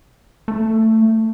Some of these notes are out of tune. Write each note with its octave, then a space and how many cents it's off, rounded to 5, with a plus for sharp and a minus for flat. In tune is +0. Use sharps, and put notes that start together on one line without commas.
A3 +15